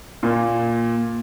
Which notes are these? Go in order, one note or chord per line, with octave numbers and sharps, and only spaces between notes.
A#2 A#3